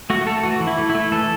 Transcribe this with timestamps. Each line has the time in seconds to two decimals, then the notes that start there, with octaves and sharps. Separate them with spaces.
0.10 A3 F#4
0.26 A3 A4
0.43 E3 F#4
0.61 E3
0.67 E4
0.79 A3
0.90 E4
0.95 A3
1.12 E3 A4